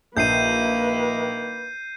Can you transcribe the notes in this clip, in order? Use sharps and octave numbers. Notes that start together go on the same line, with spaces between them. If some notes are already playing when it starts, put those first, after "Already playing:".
A#1 D#3 A#3 B4 G6 C7 D#7